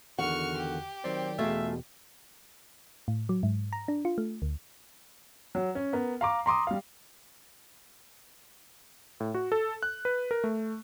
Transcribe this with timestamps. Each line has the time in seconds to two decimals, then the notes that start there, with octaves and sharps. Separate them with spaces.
0.19 E2 D3 D#3 F#4 F#5 C#6 F6
0.57 G4
1.04 D#3 F#3 C4 D5
1.39 E2 B2 A3 F4 G#4 E5
3.08 A2
3.29 F#3
3.43 G#2
3.73 A#5
3.88 D4
4.05 F4
4.18 A3
4.42 D2
5.55 F#3
5.75 C#4
5.93 B3 A#4
6.21 F5 A#5 D6
6.46 A#5 C6 D6 D#6
6.67 G3 F5
9.20 A2
9.34 F#4
9.52 A4
9.83 F#6
10.05 B4
10.31 A#4
10.44 A3